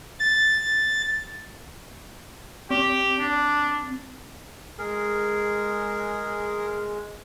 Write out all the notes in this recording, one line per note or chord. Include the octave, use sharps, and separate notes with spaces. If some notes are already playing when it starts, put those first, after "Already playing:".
A6
C4 G4
D4
G#3 G#4 A#4